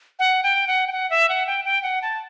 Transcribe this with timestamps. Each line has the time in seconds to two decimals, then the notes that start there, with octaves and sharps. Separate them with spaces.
0.19 F#5
0.43 G5
0.67 F#5
0.87 G5
0.92 F#5
1.10 E5
1.29 F#5
1.47 G5
1.65 G5
1.83 F#5
2.02 A5